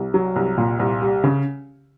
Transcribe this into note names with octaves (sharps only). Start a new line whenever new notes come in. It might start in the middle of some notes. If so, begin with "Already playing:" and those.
Already playing: C2
F#3
C2
A#2
C2
G3
C#3